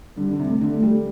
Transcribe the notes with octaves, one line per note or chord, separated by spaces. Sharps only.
D3 G3
D3
C3
A3
D3
A3
G3